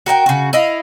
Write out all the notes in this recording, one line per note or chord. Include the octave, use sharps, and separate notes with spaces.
F#4 A#4 F#5 G5
C#3 F#4
E4 D#5 F5